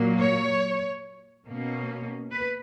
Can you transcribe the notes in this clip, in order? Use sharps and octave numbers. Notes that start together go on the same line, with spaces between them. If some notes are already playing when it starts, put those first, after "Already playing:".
Already playing: A#2 F#3 A#3
C#5
B2 A#3 C#4
B4